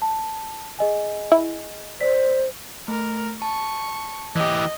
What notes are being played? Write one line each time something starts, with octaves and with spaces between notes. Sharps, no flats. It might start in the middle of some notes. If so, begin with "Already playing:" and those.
A5
G#4 D#5 G#5
E4
C5 D5 B6
A3 A#4
A5 C#6
E3 G4 D#5